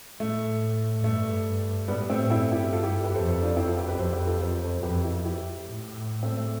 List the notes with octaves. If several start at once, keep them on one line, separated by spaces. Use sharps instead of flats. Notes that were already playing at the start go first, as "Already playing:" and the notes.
A2 A3
G2 A3
A2 G3 B3
A3 C4
G2 C4 E4
E4 G4
F4 A4
E4 G4
G4 B4
F2 A4 C5
A4 C5
D4 F4
C4 E4
F4 A4
G4 B4
G4 B4
F2 A4 C5
G4 B4
F4 A4
A4 C5
A4 C5
F2 G4 B4
E4 G4
E4 G4
A2
A3 C4
A3